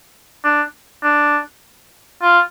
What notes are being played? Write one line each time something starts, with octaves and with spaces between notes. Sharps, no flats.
D4
D4
F4